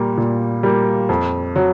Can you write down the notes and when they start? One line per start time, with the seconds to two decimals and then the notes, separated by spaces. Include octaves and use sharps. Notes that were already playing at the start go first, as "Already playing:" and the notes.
Already playing: A#2 G3 A#3
0.17 A#2
0.63 G3 A#3
1.09 F2
1.56 F#3